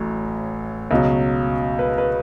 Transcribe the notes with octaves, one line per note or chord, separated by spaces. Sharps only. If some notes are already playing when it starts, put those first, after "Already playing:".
Already playing: A1 A2 F#3
C#2 B2 F#3
B4
B4